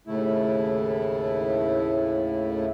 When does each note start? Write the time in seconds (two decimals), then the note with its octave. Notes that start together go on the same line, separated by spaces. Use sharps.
0.07 D#2 A2 C#3 A3 E4